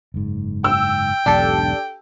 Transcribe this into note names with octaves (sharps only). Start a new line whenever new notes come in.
F#1 G#2
G5 E6
B1 E2 G#2 D4 G4 A4